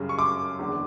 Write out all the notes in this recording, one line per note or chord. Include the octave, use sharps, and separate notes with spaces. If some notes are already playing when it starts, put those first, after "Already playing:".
Already playing: F#2 C#3 G3
C#6
D6
F#1 E2 D3